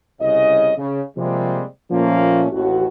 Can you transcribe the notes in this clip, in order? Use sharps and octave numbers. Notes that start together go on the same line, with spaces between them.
C2 C#3 D#5
C#3
C3 F3 G3 G#3 A#3 C4
A#2 F3 A3 A#3 C#4
A1 D#2 F#4